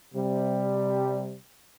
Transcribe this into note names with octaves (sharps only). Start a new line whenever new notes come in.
C3 G3